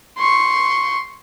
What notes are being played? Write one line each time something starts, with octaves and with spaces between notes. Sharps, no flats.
C6 C#6